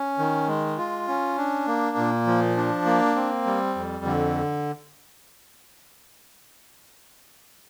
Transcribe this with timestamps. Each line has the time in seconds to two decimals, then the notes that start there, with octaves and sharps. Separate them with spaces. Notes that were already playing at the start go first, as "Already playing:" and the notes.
Already playing: C#4
0.19 D#3
0.48 G#3
0.78 F4
1.08 C#4
1.37 D4
1.67 A#3
1.97 A#2
2.27 F3
2.57 D4
2.86 A#3
3.16 C4
3.46 G3
3.75 F2
4.05 D3